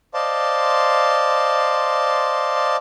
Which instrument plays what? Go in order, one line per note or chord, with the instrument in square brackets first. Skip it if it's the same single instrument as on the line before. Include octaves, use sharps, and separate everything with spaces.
[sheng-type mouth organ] C5 D5 D#5 F5 A5 C6